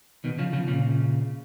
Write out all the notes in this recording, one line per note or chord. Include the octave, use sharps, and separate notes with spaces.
B2 D#3
C#3 F3
C#3 F3
A#2 C#3